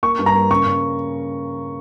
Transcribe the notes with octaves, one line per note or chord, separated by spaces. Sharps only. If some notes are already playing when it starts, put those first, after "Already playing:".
A#3 C#6
G2
A#5
A#3
C#3 C#6
C#3